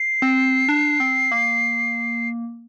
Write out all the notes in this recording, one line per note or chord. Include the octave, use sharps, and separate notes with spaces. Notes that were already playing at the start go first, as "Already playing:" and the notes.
Already playing: C7
C4
D4
C4
A#3